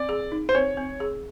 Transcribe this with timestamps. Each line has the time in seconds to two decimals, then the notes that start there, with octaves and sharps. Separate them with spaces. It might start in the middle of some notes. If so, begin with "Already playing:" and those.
Already playing: C4 D5
0.09 G#4
0.32 D#4
0.49 C5
0.55 C4 C#5
0.77 C4
1.00 G#4